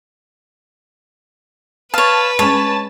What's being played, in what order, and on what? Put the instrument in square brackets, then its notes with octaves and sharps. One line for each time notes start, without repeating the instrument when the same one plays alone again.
[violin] B4 [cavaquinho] C#5 F5 [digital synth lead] A5
[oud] G#3 C#4 [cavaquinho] C#5 [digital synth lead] A5